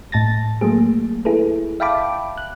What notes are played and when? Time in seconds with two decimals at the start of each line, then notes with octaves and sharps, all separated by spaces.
0.12 A2 A5 A6 A#6
0.61 F#3 A3 A#3 G#4
1.25 E4 G#4 A4 B4
1.80 E5 F5 G5 A5 B5 D6
2.38 F#6